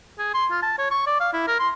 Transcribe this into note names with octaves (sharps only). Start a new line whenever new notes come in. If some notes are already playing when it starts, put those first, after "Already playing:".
G#4
C6
F4
A5
C#5
C#6
D5
F5
E4
A#4
C6